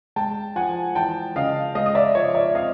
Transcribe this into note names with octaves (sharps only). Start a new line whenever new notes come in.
G#3 G5 A5
F3 F#5 G#5
E3 G5 A5
C#3 D#5 F5
G#3 D#5 F5
D#5
D5 E5
F3 C#5 D#5
D5 E5
C4 D#5 F5